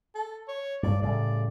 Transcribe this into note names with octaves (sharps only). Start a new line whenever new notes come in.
A4
C#5
G2 D5
A2 C#3 G3 D5